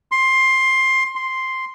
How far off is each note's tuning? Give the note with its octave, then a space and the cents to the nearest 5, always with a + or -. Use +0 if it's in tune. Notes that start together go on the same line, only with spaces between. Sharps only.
C6 +15
C6 +0